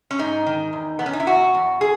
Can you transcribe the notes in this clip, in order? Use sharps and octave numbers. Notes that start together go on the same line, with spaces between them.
C#4
G#2 D#4
D#3
E2
E2 B3
C#4
D#4
E4
E2 F#4
E2
G#4